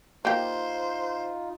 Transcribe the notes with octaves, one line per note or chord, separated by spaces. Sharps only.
A#3 D#4 F4 G4 C5